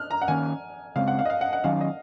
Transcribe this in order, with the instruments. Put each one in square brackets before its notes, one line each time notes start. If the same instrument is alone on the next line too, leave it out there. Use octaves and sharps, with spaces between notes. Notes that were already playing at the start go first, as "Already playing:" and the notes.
Already playing: [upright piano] F6 F#6
A#5
F#5
[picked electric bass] D#3 A#3 C#4 [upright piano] G#5
[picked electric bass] C#3 G#3 C4 [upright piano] F5
[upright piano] F#5
F5
D#5
F5
F#5
F#5
[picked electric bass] D#3 F#3 C#4 [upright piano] F5
[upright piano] D#5